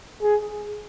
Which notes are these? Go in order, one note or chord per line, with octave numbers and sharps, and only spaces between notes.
G#4